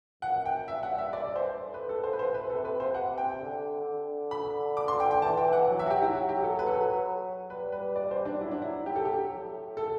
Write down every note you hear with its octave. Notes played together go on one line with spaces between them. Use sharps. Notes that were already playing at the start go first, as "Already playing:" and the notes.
F#2 F#5
G5
G2 E5
F#5
E5
D5
C5
A2
B4
A4
C5
B4
C5
B4
C3 A4
B4
C5
F#5
G5
D3
D3
B5
D6
C6
G5
G5
E3 A5
G5
F#5
F#3
E5
F#4
G4
E4
F#3 F#4
G4
A4
B4
A4
B4
G3 B4
B4
D5
C5
D4
F#3 E4
D4
E4
G4
A4
G4
A2
A4